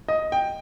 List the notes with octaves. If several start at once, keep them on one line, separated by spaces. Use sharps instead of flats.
D#5
G5